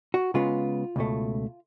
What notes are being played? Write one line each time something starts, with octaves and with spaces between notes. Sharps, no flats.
F#4
C#3 G#3 B3 F4
C#2 B2 A3